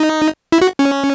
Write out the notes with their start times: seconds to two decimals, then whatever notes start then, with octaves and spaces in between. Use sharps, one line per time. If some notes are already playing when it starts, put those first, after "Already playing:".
Already playing: D#4
0.52 E4
0.61 F#4
0.79 C#4